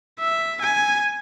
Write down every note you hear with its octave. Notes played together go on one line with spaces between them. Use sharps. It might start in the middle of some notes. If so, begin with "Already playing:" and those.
E5
G#5